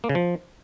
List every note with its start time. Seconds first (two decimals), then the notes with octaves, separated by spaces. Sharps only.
0.04 A#3
0.09 C#3
0.15 F3